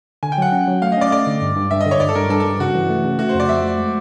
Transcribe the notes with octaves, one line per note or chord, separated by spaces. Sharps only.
D3 G#5
G5
F#3 F#5
C#4
F#3
A3 F5
D#5
C#4 D5
A3 D5
D3
G2
G2
G2 E5
D#5
D3
C#5
G2 D5
A4
G2 A#4
G2 A4
G2 A4
C#3 F#4
E3
A3
C#3
A3 F#4
C5
F2
D5
F2 E5
A3
G#3